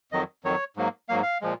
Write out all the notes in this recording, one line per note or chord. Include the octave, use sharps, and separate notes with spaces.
F2 D#3 F#3 D#5
F2 D#3 F#3 C#5
G#2 F#3 A#3
G#2 F#3 A#3 F5
F5
A#2 F3 G#3